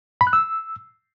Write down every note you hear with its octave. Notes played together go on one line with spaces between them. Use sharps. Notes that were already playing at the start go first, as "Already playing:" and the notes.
B5
F#6
E6